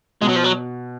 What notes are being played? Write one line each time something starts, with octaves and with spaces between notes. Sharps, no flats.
B2 G#3
F#3
F3
F#3